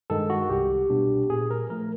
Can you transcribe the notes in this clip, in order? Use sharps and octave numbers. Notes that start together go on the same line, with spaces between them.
G2 D#3 G#3 A4
F#4
C2 G4
B2 G3 B3 D4
A#2 G#4
A#4
F3 A3 A#4